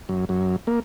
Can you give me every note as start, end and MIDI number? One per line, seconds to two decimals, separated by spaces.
0.09 0.25 42
0.29 0.56 42
0.67 0.80 58